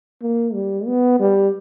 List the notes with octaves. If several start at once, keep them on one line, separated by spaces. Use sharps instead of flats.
A#3
G3
B3
G3